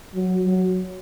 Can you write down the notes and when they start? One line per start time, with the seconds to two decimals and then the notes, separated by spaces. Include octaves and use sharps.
0.15 F#3
0.45 F#3